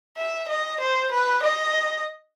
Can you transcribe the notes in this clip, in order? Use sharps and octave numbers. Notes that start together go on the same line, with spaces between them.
E5
D#5
C5
B4
D#5